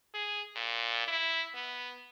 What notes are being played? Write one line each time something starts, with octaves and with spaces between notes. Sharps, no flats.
G#4
A#2
E4
B3